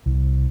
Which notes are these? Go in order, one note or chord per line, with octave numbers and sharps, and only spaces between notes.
C2